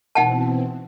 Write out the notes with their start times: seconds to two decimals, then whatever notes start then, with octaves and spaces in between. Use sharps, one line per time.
0.15 B2 E3 C4 D#4 F#5 A5